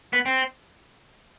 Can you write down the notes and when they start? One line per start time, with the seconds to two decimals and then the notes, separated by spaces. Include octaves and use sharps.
0.13 B3
0.26 C4